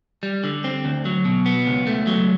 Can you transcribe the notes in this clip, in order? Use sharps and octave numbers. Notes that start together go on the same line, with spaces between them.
G3
D3
C4
D2
F#3
B2
B3
C#2
A3
F#3